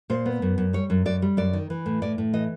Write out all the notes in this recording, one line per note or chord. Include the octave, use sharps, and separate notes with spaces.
A#2 C5
B3
F#2
F#2
G3 C#5
F#2
F#2 D5
G3
F#2 D5
D#3
E3
A2
A2 D5
A2
E3 D#5